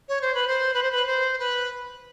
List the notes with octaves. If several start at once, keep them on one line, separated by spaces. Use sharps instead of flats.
C#5
C5
B4
C5
B4
C5
B4
C5
B4